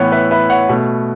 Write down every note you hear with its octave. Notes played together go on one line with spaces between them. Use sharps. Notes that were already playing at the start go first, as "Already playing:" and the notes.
Already playing: A2 E3 B3 C#5 F#5
B4 E5
B4 E5
C#5 F#5
B2 A3